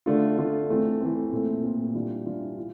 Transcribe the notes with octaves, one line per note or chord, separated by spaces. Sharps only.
D3 A3 D4 F4
D3 A3 D4 F4
E3 A3 C4
E3 A3 C4
A#2 A3 C4
A#2 A3 C4
E3 G3 D4 F4
E3 G3 D4 F4
F4